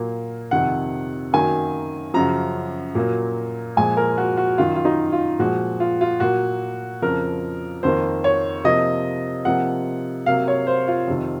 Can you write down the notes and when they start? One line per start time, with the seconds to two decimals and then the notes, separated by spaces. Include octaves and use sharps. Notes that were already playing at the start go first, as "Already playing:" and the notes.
Already playing: A#2 F#3 A#3
0.51 F2 C3 D#3 F#5
1.33 F#2 D#3 F#3 A#3 G#5
2.14 F#2 C#3 F3 A#5
2.95 A#2 F#3 A#3
3.77 A#2 F3 G#3 G#5
3.97 A#4
4.18 F#4
4.37 F#4
4.58 F#2 D#3 F#3 F4
4.75 F4
4.85 D#4
5.12 F4
5.39 A#2 F3 G#3 F#4
5.80 F4
6.01 F4
6.20 A#2 F#3 A#3 F#4
7.02 F2 C#3 F3 A#4
7.83 F2 D#3 A#3 C5
8.24 C#5
8.64 C3 F3 A#3 D#5
9.45 C3 F3 A#3 F#5
10.26 C3 F#3 A#3 F5
10.48 C#5
10.67 C5
10.88 F4
11.07 F2 C3 D#3